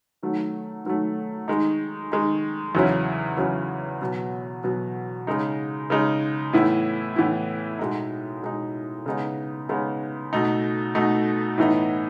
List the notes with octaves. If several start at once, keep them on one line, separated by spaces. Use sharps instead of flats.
D#3 F#3 A3
D#3 F#3 A3
D#3 G#3 D#4
D#3 G#3 D#4
E2 C#3 F#3 C#4 E4
E2 C#3 F#3 C#4 E4
B2 F#3 B3
B2 F#3 B3
C#3 G#3 D#4
C#3 G#3 D#4
A2 E3 B3 E4
A2 E3 B3 E4
B2 G#3 D#4
B2 G#3 D#4
C#3 G#3 B3 D#4
C#3 G#3 B3 D#4
B2 A3 D#4
B2 A3 D#4
A2 E3 B3 D#4